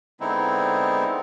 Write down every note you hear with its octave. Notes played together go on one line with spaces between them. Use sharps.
D3 G#3 B3 C4 D#4 E4